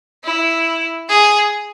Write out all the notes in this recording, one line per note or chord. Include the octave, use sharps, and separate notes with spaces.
E4
G#4